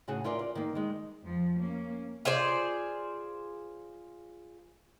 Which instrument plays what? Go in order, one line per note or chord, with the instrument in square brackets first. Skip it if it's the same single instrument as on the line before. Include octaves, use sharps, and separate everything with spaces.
[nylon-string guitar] A2 C#3 F#4 G#4 F#5
E4 F4 A#4 D5
D5
D#3 A#3
D#3 G#3
[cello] F2 F3
A#3 C#4
[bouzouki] F4 G#4 C5 D5